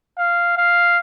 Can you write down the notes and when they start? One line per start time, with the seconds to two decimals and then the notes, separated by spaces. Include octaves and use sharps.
0.18 F5
0.57 F5